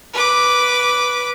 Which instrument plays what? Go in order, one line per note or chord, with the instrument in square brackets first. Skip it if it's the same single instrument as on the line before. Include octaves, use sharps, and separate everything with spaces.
[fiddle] B4 D6